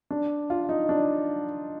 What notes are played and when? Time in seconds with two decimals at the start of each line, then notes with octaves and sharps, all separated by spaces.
0.10 D4
0.50 F4
0.69 D#4
0.89 D4